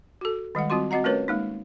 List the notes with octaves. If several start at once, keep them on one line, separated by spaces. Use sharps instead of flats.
F#4 A4
D#3 G3 G#3 F#5
G3 C4 F4 F#4 C6
C4 F#4 D#5 F#5 A#5
A3 C#4 F4 A#4 B4 C#5
G#3 A#3 D#4